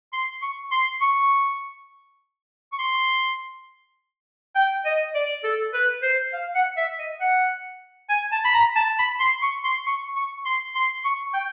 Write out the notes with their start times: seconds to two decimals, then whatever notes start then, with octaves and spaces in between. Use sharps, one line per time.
0.13 C6
0.42 C#6
0.72 C6
1.01 C#6
2.72 C#6
2.79 C6
4.55 G5
4.85 D#5
5.15 D5
5.44 A4
5.74 B4
6.02 C5
6.33 F5
6.55 F#5
6.77 E5
6.99 D#5
7.20 F#5
8.09 G#5
8.32 A5
8.45 B5
8.54 A#5
8.76 A5
8.99 B5
9.20 C6
9.42 C#6
9.64 C6
9.86 C#6
10.16 C#6
10.45 C6
10.75 C6
11.05 C#6
11.34 G5